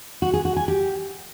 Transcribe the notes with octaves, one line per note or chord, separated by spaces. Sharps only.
F#4
G#4
F#4
G#5
G4